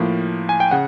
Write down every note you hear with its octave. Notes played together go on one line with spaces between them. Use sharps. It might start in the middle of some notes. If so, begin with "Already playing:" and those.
Already playing: A2 F3 A#3
G#5
G5
C#3 F#5